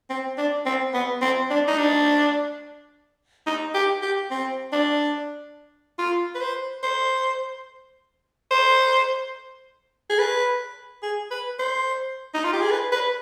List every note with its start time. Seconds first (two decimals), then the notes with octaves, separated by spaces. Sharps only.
0.10 C4
0.38 D4
0.66 C4
0.94 B3
1.22 C4
1.51 D4
1.68 D#4
1.78 D4
3.46 D#4
3.74 G4
4.02 G4
4.31 C4
4.73 D4
5.99 F4
6.35 B4
6.41 C5
6.83 C5
8.51 C5
10.10 G#4
10.19 B4
11.03 G#4
11.31 B4
11.59 C5
12.34 D#4
12.44 F4
12.53 G4
12.62 G#4
12.71 B4
12.92 B4